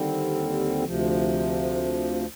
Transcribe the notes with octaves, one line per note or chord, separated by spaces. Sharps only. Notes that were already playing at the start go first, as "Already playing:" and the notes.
Already playing: D#2 D3 G3 C4
D2 C3 F3